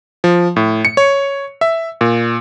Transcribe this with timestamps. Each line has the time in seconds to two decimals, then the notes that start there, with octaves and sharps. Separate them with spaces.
0.24 F3
0.56 A2
0.85 C#7
0.97 C#5
1.61 E5
2.01 A#2